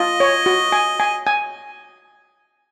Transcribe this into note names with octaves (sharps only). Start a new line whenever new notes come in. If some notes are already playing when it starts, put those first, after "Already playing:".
Already playing: F4 D#5
C#5
F#4
G#5
G#5
G#5